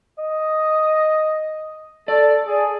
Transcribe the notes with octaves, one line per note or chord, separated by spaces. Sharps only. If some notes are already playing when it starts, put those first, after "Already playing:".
D#5
A4 D5
G#4